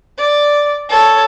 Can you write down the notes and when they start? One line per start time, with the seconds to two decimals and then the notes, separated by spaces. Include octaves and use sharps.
0.17 D5
0.89 A4 C#5